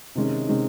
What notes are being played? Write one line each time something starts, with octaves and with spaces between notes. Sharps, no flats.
C3 D#3 G#3 C#4
C3 D#3 G#3 C#4